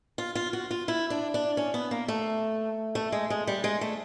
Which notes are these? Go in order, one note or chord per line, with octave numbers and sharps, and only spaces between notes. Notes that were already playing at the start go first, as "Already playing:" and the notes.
F4
F4
F#4
F4
E4
D4
D4
C#4
B3
A#3
A3
A3
G#3
G#3
G3
G#3
A3